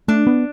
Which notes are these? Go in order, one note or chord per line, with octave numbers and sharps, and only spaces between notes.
A3 D4
B3